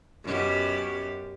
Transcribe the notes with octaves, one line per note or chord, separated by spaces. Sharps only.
F#2 B2 G4